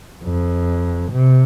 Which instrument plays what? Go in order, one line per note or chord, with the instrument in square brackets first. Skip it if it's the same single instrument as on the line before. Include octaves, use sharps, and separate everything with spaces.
[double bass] F2
C3